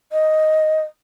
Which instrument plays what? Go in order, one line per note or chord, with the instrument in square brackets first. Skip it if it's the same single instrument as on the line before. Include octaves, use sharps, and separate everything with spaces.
[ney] D#5